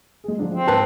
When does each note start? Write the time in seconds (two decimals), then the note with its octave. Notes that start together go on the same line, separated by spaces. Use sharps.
0.24 G#3 G#4
0.39 D3 F3 D4
0.54 F3 C4
0.68 G#2 B4 A5